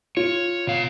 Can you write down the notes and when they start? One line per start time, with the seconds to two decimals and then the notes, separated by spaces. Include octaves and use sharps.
0.17 F4 C#5
0.67 B2 F5